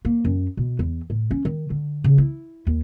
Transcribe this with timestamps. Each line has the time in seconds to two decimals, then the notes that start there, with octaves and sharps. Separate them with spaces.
0.05 A#3
0.25 F#2
0.57 B2
0.79 E2
1.10 A2
1.31 C#4
1.45 D#3
1.70 D3
2.04 C#3
2.18 E4
2.67 D#2